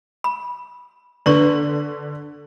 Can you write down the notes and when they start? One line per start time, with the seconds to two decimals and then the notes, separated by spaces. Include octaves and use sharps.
0.24 B5
1.26 D3 D4 B4 D5 A#5 C#6 F#7